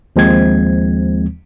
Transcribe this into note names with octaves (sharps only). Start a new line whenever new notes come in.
D#2 F3 G#3 C4 G#6